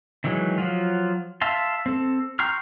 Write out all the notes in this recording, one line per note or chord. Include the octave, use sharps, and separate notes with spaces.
D#3 E3 F#3 G#3
F3 F#3 F4
E5 F5 A5 C6
C4 A4
G5 A#5 C6 C#6 F6